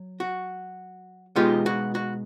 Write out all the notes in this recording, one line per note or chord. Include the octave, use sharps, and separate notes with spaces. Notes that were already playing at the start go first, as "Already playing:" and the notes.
Already playing: F#3
F#4
B2 G#3 B3 D#4 F4 G4
F#4
F#4